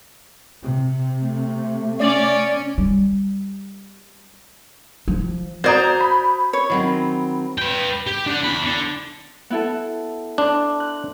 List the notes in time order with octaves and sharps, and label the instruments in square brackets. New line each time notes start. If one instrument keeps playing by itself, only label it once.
[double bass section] C3
[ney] A3
[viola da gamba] C#4 [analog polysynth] D5 D6
[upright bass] G3
F3
[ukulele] F#4 D5 [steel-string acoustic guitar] C5 A#5 [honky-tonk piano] D#6 G6 G#6
[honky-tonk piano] B5
[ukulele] C#5
[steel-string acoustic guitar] D#3 F#3 C4
[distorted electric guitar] B4 G5
G4
D4 F#5
E2 B5
D3
[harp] B3 E4 A4
[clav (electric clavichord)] D4 [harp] C6
[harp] F#6